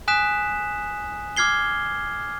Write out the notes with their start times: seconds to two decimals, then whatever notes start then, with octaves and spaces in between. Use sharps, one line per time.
0.08 G#5 D#6 F#6 B6 E7
1.37 D6 F6 G#6 C7 G7